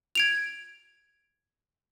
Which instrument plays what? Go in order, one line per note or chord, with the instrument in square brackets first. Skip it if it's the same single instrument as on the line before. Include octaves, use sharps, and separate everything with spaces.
[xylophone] G#6 D7 F7